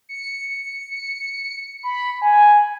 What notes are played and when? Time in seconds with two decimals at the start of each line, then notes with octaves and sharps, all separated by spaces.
0.09 C#7
1.83 B5
2.22 G#5